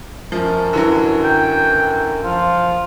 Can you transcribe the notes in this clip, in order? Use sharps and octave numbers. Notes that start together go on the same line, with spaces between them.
F#2 F3
D3 E3 F#3
G5
F3 F4